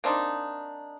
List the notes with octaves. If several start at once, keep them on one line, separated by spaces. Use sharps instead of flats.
A#3 C4 D4 D#4